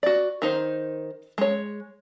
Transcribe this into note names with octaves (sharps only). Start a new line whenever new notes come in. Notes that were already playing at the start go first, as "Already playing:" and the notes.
F#4 D5
D#3 D#4 C5
G#3 C#5